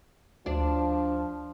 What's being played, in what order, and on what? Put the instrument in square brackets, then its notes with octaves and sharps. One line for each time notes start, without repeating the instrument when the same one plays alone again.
[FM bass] D2 [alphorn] F3 [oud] D4